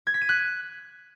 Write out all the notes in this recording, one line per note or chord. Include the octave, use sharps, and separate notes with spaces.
G#6
B6
D#7
F#6